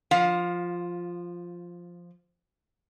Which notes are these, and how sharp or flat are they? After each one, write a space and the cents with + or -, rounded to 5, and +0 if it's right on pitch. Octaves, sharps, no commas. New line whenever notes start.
F3 +0 F5 +25